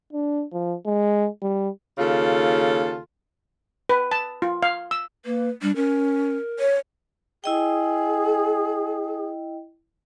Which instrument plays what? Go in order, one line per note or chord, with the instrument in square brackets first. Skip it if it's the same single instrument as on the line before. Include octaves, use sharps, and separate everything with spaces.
[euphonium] D4
F3
G#3
G3
[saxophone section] D#2 C#3 F4 A4
[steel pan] B4
A5
F4
F5
E6
[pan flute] A#3 [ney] B4
[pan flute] G3 [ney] D4
[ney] C#4 [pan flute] A#4
[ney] C#5
[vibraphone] E4 D#5 G5 [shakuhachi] G#4